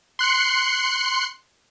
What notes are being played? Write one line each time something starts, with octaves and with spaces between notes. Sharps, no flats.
C6 F#6 C7 C#7